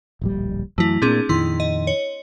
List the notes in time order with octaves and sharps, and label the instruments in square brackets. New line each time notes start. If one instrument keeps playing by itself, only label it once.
[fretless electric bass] D1 A#1 G3
[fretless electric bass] F#2 E3 F#3 [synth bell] A3 E4
[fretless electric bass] A#2 A#3 [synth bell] C4 D4 G#4
[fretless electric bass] F2 A#2 D#3 [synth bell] E4 C6
[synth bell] D#5
C#5